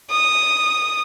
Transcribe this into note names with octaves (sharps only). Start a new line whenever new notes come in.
D#6